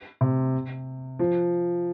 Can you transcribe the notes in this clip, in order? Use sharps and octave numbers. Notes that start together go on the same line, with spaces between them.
C3
F3